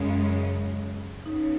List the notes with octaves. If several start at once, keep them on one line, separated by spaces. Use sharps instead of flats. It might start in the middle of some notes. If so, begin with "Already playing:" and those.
Already playing: F#2 C#3 G#3
C#3 F#3 B3 D#4